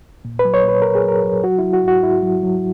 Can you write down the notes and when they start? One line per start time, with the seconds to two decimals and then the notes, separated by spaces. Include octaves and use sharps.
0.25 A#2
0.39 B4
0.45 F#3
0.54 C#5
0.64 A#2 B4
0.82 A#2 A#4
0.95 G#4
1.04 F#3 A#4
1.24 F#3
1.44 F#3 F#4
1.59 F#3 E4
1.73 F#4
1.84 G#2 F#4
2.03 G#2 E4
2.23 F#3
2.43 F#3